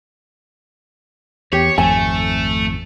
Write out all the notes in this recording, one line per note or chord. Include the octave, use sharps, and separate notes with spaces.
E2 G4 C#5
G#1 F2 A3 G#5